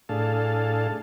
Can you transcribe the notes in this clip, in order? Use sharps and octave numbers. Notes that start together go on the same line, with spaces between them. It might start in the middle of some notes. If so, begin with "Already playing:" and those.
A2 D4 G#4 A4 F5 A5